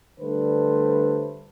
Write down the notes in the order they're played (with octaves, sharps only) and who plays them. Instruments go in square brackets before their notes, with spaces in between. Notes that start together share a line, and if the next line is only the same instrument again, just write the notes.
[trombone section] D3 G3 A3 B4 C5